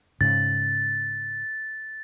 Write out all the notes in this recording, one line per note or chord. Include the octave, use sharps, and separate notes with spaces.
G#2 C#3 A6